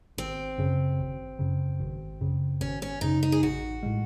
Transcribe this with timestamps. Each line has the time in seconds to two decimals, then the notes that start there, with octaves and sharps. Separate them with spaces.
0.18 G#1 C4
0.58 F#2 C#3
0.99 G#1
1.39 F#2 C#3
1.80 G#1
2.21 F#2 C#3
2.61 G#1 C#4
2.82 C#4
3.01 F#2 C#3 D#4
3.23 D#4
3.32 G#4
3.42 A1 F#4
3.83 A2 G#3